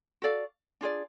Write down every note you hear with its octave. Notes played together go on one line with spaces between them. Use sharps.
F#4 A4 D5 F5
D4 F4 G#4 D5